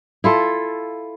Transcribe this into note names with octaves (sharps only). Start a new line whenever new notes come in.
E4 F4 A4